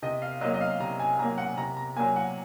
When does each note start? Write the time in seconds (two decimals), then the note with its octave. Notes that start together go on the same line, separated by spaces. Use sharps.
0.02 C3 D#5
0.22 F5
0.41 F#3 A#3 D#5
0.54 D#5
0.61 F5
0.80 C3 A#5
0.99 G#5
1.18 F#3 A#3 A#5
1.38 F#5
1.57 C3 A#5
1.77 A#5
1.96 F#3 A#3 G#5
2.16 F#5